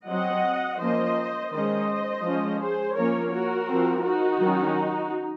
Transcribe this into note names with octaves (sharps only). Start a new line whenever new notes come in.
F#3 C4 D#5 F#5
F3 A#3 C#4 C5 D#5
D#3 G#3 C#4 C5 D#5
F3 G#3 C#4
G#4 C5
F3 A#3 C#4 A#4 C#5
F#4 A#4
F3 C4
D#4 F#4
D#3 F#3 C#4